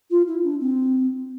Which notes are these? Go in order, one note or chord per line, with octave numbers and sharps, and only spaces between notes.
F4
E4
D4
C4